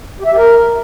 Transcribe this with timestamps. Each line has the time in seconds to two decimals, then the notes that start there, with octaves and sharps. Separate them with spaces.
0.20 G4
0.25 E5
0.31 G4
0.37 A#4